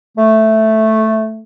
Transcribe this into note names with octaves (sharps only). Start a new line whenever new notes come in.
A3